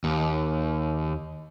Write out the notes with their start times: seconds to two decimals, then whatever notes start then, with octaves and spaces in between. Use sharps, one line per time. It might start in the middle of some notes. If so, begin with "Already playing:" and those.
0.04 D#2